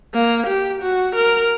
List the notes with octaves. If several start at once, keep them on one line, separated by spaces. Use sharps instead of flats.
A#3
G4
F#4
A#4